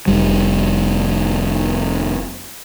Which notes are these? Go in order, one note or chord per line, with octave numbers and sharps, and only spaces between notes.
F1 G3